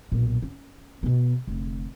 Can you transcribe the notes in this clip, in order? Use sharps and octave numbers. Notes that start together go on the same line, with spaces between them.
B1 A#2
C#4
B2 B3
F1 D3